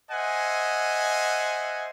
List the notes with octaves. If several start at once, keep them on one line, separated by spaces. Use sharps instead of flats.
C5 D#5 E5 F#5 G#5